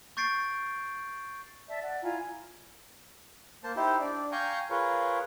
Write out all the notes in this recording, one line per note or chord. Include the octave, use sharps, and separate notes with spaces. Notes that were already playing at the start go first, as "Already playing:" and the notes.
C#6 G6 A6 C7 D7
D5 E5 A5
D5 F#5
E4 F4 G#5 A#5
A#3 C5 A5
D#4 E4 G4 C5
D4 D5
F5 G5 G#5 A#5 C#6 G6
F4 G#4 A#4 B4 C#5